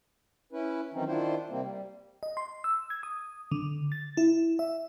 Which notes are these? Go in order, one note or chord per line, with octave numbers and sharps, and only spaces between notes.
C#4 E4 B4
D#3 E3 F#3 C4 C#4 D#4
D#3 D4 E4 F4 C5
C3 G3 A#3 C4
G3
D#5
C6
E6
G#6
D#6
D3
A6
E4
E5